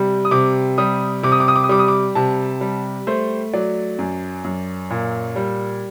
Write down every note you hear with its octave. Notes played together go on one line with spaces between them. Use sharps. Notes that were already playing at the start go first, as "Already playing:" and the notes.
Already playing: C3 G3
D#6
C3 D6
G3 D#6
C3 D6
D#6
D6
D#6
D6
D#6
G3 D6
D#6
D6
C3 A5
G3
A3 C5
F#3 D5
F#2
F#2
A#2
G3